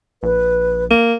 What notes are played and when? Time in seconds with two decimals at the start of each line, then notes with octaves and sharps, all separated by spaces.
0.23 A#1 B4
0.91 A#3